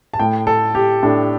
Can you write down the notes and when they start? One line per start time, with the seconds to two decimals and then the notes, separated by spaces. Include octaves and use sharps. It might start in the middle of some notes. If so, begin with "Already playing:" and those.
0.14 A5
0.19 A2 A3 G5
0.47 A4
0.75 G4
1.03 A2 A3 D4